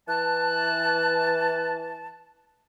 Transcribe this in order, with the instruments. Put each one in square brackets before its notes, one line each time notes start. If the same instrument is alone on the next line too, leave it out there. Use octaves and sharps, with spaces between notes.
[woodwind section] E3 A5 [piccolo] F#6